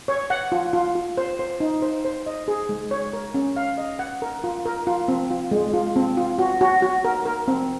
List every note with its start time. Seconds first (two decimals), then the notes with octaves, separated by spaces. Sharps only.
0.08 C#5
0.30 F#5
0.52 F4
0.73 F4
0.95 F4
1.18 C5
1.39 C5
1.60 D#4
1.82 C5
2.05 C5
2.26 D#5
2.48 G#4
2.69 G#3
2.91 C#5
3.13 A#4
3.34 C#4
3.56 F5
3.78 D#5
3.99 F#5
4.22 A#4
4.44 F4
4.66 A#4
4.87 F4
5.08 C4
5.31 F4
5.51 G#3
5.73 F4
5.96 C4
6.17 F4
6.39 F#4
6.61 F#4
6.82 F#4
7.05 A#4
7.25 A#4
7.48 C4